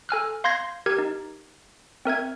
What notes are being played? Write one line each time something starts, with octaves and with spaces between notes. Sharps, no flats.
A4 G#5 F6 F#6
F5 C6 G6 G#6 A#6 C7
G4 A#4 G#6
D#4
C4 A#4 E5 G#6